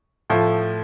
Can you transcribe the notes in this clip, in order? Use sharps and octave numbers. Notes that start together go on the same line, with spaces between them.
A2 F3 A3